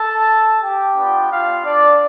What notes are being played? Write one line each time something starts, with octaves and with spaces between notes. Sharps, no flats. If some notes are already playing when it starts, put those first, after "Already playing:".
Already playing: A4 A5
G4 G5
B3 D4 F4
F4 F5
D4 D5